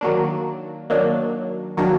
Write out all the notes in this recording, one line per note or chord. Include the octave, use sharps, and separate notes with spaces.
D#3 F#3 A#3 D4
D#3 F#3 A#3 D4
D#3 F#3 A#3 D4